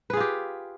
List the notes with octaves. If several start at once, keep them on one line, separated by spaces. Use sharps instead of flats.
F4 G4 G#4 B4